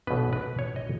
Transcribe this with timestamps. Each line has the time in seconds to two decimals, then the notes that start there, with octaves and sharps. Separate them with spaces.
0.07 B1 B2 F#3 B3 D#4 B4
0.33 B4
0.59 C#5
0.76 D#5